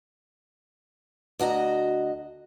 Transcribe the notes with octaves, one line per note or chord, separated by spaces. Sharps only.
D2 F#4 D#5 A#5